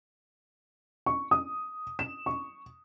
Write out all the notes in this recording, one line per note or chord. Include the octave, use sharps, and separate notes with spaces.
C#6
D#6
E7
C#6